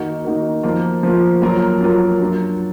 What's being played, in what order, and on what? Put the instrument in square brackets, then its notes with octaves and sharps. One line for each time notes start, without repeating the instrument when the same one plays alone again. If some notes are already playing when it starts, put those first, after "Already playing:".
Already playing: [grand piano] D#3 A#3 D#4 F#4 A#4
D#3 A#3 D#4 F#4 A#4
F3 A#3 F4
F3 A#3 F4
F#3 A#3 F4 A#4
F#3 A#3 F4 A#4
F#3 D4 F4 A#4